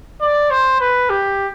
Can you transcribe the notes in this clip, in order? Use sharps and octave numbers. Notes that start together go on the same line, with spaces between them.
D5
C5
B4
G4